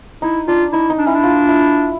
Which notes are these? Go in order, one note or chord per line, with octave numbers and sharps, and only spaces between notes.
D#4 E4
D4 F4
D#4 E4
D#4
D4
C#4 E4
D4
F4
E4